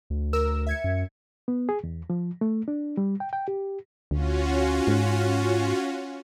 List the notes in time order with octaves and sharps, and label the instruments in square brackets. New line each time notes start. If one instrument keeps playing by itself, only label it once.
[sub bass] D2
[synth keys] A#4 E6 E7
E5 G#6 C#7
[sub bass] F#2
[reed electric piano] B3
G#4
E2
F3
A3
D4
G3
G5
G5
G4
[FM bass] D2 [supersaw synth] C#4 F4 F#4
[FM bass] G#2